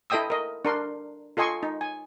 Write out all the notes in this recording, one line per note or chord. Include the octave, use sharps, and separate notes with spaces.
E4 A4 D#5 G5 D#6 E6
A#4 D#5
D4 A#4 C6
F4 A4 D#5 G#5 C6 C#6
D#4
G#5